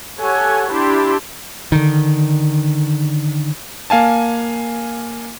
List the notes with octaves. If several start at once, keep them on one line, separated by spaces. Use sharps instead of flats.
G4 A4 C#5 F#5 G#5
D4 E4 G4 A5 C6
D3 D#3
A#3 F5 G#5 A5